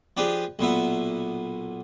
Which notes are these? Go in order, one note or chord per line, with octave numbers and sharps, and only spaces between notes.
F3 D4 G4 G#4 B4
B1 A#2 B3 E5